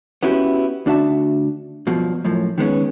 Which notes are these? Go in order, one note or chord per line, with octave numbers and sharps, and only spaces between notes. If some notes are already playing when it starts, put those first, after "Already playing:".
B3 C#4 E4 F#4 G4
D2 D4 F#4 E5 A5
G2 B2 F3 F#3
F#2 A2 F3
D#3 G#3 B3 C#4